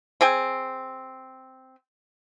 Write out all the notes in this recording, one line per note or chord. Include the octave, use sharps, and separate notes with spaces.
C4 G#4 G5 G#5